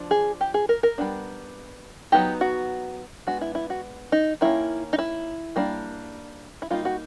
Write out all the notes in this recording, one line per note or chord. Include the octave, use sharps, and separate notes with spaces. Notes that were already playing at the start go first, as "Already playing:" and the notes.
Already playing: F3 D4
G#4
G4
G#4
A#4
A#4
G3 B3 D4
F#3 B3 D#4 G4
F#4
G#3 B3 D4 F#4
E4
E4
F#4
D#4
D#3 G3 A#3 C#4 E4
D#4
E4
G3 A#3 D4
E4
G3 A#3 D#4 F4
F#4